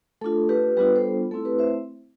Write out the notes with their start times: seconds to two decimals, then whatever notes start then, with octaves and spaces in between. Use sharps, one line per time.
0.21 A3 D4 F4 A4
0.49 G4 B4
0.77 G3 B3 D4 F4 G4 B4
0.95 A4 C5
1.31 A3 C4 E4 A4
1.45 G4 B4
1.59 C5 E5